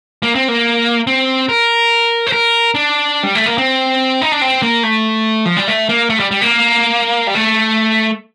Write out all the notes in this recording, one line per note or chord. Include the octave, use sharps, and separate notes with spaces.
A#3
C4
A#3
C4
A#4
C5
A#4
D4
G3
A3
A#3
C4
D#4
D4
C4
A#3
A3
F3
G3
A3
A#3
A3
G3
G3
A#3
G3
A3